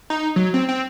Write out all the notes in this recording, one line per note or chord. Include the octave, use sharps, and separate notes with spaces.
D#4
F#3
C4
C4